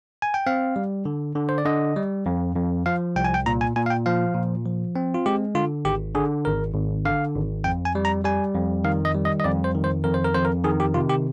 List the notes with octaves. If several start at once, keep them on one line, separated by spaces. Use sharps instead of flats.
G#5
G5
C4 F5
G3
D3
D3
C5
D5
D3 D#5
G3
F2
F2
F3 F5
C2 G5
G#5
G5
A#2 A#5
G#5
A#2 G#5
F5
G5
F3 F5
A#2
F3
C4
F4
G#3 G4
D3 F4
G#1 G4
D3 G#4
G#1 A#4
G#1
D3 F5
G#1
F2 G5
G#5
G3
A#5
G3 G#5
F2
D#3 F5
D#5
G3
D#5
D#5
F2 D5
C5
D#3
C5
F2 A#4
C5
A#4
F2 C5
A#4
D#3 G#4
G4
C3 F4
G4